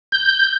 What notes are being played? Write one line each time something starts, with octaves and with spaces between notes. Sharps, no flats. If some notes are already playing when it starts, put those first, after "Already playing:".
G6